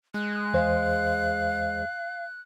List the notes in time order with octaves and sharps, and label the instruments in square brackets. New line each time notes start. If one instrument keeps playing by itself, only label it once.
[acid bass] G#3 [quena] F#6
[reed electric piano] E2 C5 [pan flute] F5